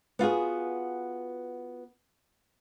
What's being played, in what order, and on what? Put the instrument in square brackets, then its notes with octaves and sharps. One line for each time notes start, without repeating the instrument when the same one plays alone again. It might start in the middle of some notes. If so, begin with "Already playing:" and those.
[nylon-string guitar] B3 F4 F#4 G#4